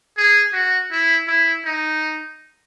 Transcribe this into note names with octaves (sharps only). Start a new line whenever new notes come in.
G#4
F#4
E4
E4
D#4